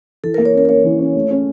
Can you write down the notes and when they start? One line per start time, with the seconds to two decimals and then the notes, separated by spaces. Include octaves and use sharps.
0.23 E3 A4
0.34 A#4
0.38 A#3
0.45 C#5
0.54 C#4 A#4
0.65 A#4
0.69 A#3 C#5
0.84 E3
0.99 C#4
1.15 A3
1.31 C#4